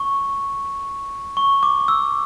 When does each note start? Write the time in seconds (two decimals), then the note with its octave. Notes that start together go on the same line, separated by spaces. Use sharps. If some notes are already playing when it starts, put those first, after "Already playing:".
Already playing: C#6
1.37 C#6
1.63 D6
1.88 E6